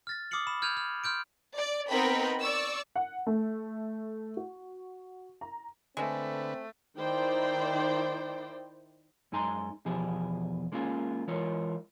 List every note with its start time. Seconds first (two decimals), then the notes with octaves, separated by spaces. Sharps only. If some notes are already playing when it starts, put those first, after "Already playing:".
0.07 F6 A6 A#6
0.31 D6 D#6 F6 C7 C#7 F#7
0.47 B5 E7
0.62 F6 G6 G#6 D7 D#7 F7
0.77 F6
1.04 C6 F6 G6 D7
1.54 D5
1.88 B3 C4 D#4 A#4 G5 B5
2.39 D5 C#6 E6
2.96 F#5
3.27 A3
4.37 F#4
5.41 A#5
5.97 D3 G#3 A3 C4 B4
6.97 D#3 D#4 E4 C5 D5 G5
9.32 F#2 G#3 D#4 G#5 A#5 C6
9.86 E2 B2 F3 G4 G#4
10.72 G#3 A#3 C#4 F4 G#4
11.27 E3 G#3 F4 A#4 C#5